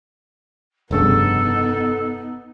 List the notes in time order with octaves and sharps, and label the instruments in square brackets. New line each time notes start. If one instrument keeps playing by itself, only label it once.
[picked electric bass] F1 G2 C#3 [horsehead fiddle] B3 D#4 [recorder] A4